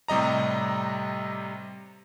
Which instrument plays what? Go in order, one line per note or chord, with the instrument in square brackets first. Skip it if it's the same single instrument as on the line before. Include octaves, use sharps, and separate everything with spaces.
[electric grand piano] A2 C3 G3 D#5 A#5